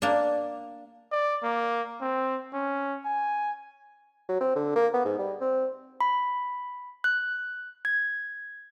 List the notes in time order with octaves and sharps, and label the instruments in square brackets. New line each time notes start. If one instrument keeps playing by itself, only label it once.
[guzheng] A#3 D4
[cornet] D5
A#3
C4
C#4
G#5
[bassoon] F#3
C4
D3
A#3
B3
G#2
G3
C4
[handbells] B5
F#6
G#6